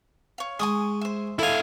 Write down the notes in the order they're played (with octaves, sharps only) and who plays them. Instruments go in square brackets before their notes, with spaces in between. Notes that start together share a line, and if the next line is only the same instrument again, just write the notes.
[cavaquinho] C#5 F5
[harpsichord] G#3 [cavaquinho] G#5 C#6 D#6
[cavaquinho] C5 E5
[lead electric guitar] E4 F5 [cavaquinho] F4 D#5 [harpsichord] A4 G#5